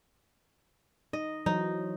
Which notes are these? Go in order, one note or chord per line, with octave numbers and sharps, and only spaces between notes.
D#4 D#5
E3 F#3 D#4 C5